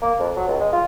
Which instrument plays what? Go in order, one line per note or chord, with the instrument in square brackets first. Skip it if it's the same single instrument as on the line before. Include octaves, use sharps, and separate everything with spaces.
[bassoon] A#3
F2
F#3
C#2
G#3
F4